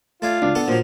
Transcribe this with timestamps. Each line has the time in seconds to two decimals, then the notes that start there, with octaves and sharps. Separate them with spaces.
0.22 A3 F4 D5 G#5
0.42 C#2 D4
0.55 B3 A4 F#5
0.68 A#2 F3 F#3